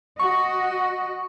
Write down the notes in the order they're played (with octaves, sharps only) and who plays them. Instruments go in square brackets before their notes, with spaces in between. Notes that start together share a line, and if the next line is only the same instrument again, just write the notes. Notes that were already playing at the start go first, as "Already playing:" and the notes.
[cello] F#4 D#5 [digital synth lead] C#6